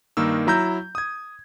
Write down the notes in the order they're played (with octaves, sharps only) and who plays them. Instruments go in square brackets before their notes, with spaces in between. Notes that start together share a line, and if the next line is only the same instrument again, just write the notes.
[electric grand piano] G2 D#3 A#3 D#4 E6
F#3 E4 A#5 E6 G6
D#6 G#6